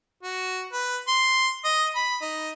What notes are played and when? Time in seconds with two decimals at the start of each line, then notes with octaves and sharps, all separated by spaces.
0.23 F#4
0.73 B4
1.08 C6
1.65 D#5
1.96 B5
2.21 D#4